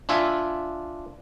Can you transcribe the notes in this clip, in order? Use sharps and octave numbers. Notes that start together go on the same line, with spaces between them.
D4 F4 E5 G#5